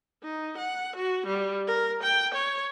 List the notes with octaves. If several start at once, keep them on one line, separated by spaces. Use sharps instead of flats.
D#4
F#5
F#4
G3
A#4
G5
C#5